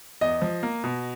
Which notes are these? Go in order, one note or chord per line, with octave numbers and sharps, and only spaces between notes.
E2 D#5
F3
A#3
B2